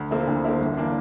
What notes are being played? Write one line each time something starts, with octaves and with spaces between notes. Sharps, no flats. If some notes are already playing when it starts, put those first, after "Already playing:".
Already playing: D2
D3 F3 A#3 E4
D2
D3 F3 A#3 E4
G1
E3 A#3 D4